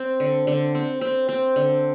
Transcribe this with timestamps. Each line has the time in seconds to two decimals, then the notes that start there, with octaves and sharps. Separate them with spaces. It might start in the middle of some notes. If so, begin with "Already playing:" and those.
Already playing: C4
0.20 D3
0.47 D3
0.75 C4
1.01 C4
1.29 C4
1.56 D3